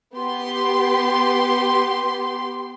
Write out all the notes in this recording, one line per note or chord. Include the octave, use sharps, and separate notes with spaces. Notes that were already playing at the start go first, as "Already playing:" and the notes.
B3 G4 C6